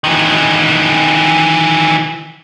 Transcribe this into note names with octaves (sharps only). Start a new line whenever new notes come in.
D#3 E3